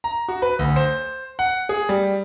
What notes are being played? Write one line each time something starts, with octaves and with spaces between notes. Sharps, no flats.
A#5
F#4
B4
D2
C5
F#5
G#4
G3